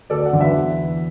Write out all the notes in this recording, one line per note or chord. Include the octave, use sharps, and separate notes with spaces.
D2 A4 D5
D5 F#5
D3 F#3
B4 E5
E2
E3